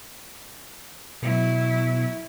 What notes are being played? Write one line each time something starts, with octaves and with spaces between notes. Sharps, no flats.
B2 F#3 E4